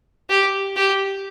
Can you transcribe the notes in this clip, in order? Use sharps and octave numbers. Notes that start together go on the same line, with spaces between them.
G4
G4